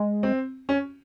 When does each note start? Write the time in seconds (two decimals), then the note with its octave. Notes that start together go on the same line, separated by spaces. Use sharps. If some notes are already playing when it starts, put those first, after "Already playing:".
Already playing: G#3
0.23 C4
0.69 C#4